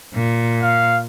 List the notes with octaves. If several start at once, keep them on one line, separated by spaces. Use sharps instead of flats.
A#2
F5